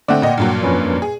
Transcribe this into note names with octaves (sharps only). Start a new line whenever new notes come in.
D3 A3 C4 D5 F#5 G5
A#2 D#5
G2 A#2 F#3
F2 C#4 B4
G#4